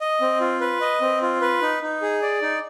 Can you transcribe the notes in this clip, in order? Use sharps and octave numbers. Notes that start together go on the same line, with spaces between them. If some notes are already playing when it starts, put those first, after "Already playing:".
D#5
C4
F4
B4
D#5
C4
F4
B4
D#4
D#4
G#4
D5
D#4